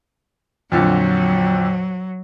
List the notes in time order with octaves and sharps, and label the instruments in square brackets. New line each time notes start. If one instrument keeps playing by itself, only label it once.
[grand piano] F2 A#2 D3 [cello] F#3